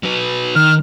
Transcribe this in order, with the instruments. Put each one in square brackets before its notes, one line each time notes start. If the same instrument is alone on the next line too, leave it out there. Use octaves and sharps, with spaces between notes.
[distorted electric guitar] F#3 B4
[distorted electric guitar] D#3 [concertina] F6